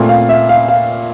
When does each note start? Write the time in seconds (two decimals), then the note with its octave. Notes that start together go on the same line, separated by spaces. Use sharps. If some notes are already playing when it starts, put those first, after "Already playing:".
Already playing: A#2 A3 C4
0.09 F5
0.29 E5
0.49 F5
0.68 F5